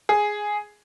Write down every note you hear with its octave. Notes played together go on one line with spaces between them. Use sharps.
G#4